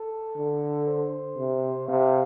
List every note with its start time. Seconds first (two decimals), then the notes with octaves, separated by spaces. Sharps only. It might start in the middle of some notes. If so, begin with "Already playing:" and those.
Already playing: A4
0.38 D3
0.88 C5
1.38 C3
1.88 C3 F5